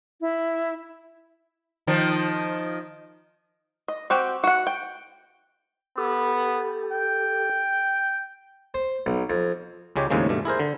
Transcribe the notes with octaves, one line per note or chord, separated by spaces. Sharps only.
E4
D#3 F3
D#5
C4 F#4 G4 G5
F#4 F#5
G5
B3 G4 A4
G5
C5
B1
F2
C#2 C#3 G#3 G4 C#5
D#2 A2 C#3 F3 G#3 A#3
G2 B2 A3
E4 G#4 A#4 C5
D3